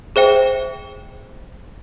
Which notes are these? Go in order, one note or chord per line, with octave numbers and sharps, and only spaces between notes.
G#4 C5 E5 G5